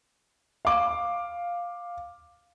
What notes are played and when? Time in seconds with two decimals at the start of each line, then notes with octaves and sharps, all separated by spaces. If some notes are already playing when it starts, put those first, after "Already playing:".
0.65 F5 D6